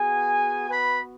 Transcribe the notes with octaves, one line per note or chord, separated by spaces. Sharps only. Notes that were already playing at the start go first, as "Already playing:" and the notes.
Already playing: B3 F#4 G#4 G#5
B4 B5